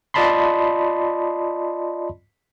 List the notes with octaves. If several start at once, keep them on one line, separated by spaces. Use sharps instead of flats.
F4 D5 D#5 A5 B5 C6